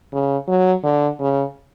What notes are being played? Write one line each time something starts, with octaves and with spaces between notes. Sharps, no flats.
C#3
F#3
D3
C#3